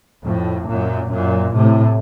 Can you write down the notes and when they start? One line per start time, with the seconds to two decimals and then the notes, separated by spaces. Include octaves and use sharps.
0.25 F2 A2
0.68 F#2 A#2
1.12 F#2 A#2
1.56 A2 C3